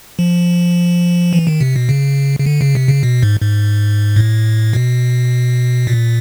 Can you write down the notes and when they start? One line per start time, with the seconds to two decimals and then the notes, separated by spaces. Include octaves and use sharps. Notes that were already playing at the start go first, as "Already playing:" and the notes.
0.19 F3
1.33 E3
1.47 D#3
1.60 C3
1.76 B2
1.89 C#3
2.40 C#3
2.46 D3
2.61 C#3
2.75 C3
2.88 C#3
3.03 B2
3.23 G#2
3.41 G#2
4.16 A2
4.73 B2
5.87 A#2